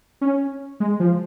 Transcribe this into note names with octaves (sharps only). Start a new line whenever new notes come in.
C#4
G#3
F3